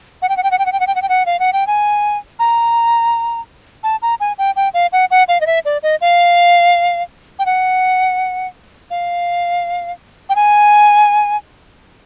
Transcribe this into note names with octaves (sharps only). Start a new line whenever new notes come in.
F#5
G5
F#5
G5
F#5
G5
F#5
G5
F#5
G5
F#5
G5
F#5
F5
F#5
G5
G#5
A#5
A5
A#5
G#5
G5
G5
F5
F#5
F#5
F5
D#5
E5
D5
D#5
F5
G5
F#5
F5
G5
G#5